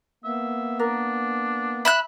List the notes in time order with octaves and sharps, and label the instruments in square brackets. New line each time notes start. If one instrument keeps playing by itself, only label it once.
[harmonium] A#3 B3 [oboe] E5
[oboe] D4 [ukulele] A#4
[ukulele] E5 [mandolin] B5 E6 F#6